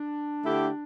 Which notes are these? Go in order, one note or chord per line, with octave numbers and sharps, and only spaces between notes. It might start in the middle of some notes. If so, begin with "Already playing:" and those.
Already playing: D4
D3 A3 E4 G4